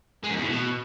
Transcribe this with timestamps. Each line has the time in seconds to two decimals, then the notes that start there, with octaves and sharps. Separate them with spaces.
0.23 G#3
0.30 F#2
0.36 E2
0.43 A2
0.49 B2